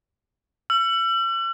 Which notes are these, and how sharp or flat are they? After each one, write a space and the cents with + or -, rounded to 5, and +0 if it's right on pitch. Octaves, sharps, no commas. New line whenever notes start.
E6 +40